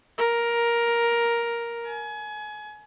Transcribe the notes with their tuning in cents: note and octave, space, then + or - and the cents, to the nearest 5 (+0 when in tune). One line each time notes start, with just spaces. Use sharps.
A#4 +10
G#5 +30